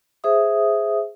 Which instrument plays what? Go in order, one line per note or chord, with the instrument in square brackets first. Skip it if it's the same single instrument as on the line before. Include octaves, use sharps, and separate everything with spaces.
[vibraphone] G#4 C5 E5 D#6